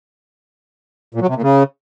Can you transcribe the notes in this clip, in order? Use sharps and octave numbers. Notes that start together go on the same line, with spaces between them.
A#2
F#3
C3
A#2
C#3